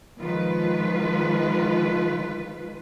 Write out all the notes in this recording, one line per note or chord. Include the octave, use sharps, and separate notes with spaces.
D#3 F3 G#3 F4 B4